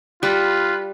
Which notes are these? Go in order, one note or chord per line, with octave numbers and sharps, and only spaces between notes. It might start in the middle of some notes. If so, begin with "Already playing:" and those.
G3 F4 B4